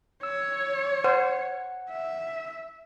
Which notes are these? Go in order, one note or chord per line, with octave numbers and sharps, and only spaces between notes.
C#5 E6
C5 F#5
E5